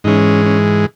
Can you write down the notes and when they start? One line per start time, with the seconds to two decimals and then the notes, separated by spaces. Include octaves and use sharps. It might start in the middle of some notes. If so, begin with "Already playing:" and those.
0.04 G#2 E3 G#3 C#4 D#4
0.46 C#4